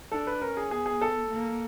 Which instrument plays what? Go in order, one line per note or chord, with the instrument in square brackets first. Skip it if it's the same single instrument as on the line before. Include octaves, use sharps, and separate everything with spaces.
[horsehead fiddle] D4 [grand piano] A4
[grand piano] B4
[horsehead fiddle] C#4 [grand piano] A#4
[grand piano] G#4
[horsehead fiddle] B3 [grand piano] G#4
[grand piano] G#4
A4
[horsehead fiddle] A#3